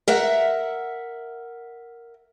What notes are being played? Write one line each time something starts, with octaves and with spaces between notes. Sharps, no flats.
A#4 E5 F#5